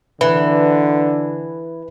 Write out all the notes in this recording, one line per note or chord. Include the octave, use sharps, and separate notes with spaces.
D3 E3 B4